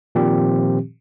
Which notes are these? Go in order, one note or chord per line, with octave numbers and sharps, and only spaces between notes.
A#2 D#3 F3 C4 G4